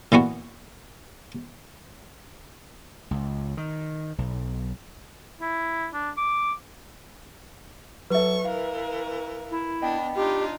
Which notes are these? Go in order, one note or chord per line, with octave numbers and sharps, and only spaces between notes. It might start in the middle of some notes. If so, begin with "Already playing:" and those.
A#2 E3 B3 F#4
C#2
D#3
B1
E4
D4
D6
F#3 A4 B4 E5 C#6
E3 A#4 F5
E4
B3 D4 D#5 G5 B5
D4 D#4 F4 G4